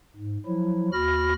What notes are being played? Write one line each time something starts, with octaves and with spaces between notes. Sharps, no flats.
G#2
F3 F#3 E4
D#2 F#4 B5 F6 A#6